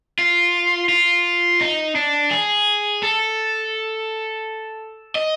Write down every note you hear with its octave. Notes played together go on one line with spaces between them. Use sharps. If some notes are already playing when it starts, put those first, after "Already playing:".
F4
F4
D#4
D4
G#4
A4
D#5